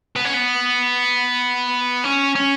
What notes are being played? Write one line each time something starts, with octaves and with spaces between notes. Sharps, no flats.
B3
C#4
B3
C#4
C#4